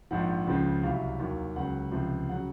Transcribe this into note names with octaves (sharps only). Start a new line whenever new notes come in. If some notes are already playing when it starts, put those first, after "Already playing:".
A#1 G#2 F3 F#5
C#2 C#3 F3
C2 C3 F#3 F5
D#2 D#3 F#3
C#2 C#3 F#3 F#5
C#2 C3 F3
C#3 F#3 F#5